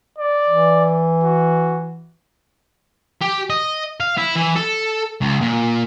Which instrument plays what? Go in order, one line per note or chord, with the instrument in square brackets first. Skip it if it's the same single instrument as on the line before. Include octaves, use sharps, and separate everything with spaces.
[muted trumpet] D5
[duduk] E3
[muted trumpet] F#4
[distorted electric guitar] G4
D#5
F5
E4
E3
A4
C#2
A#2